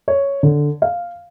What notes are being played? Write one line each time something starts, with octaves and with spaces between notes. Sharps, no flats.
C#5
D3
F5